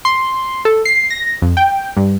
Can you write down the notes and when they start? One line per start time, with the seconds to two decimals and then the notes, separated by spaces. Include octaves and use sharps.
0.05 C6
0.65 A4
0.85 C7
1.10 A#6
1.42 F2
1.57 G5
1.97 G2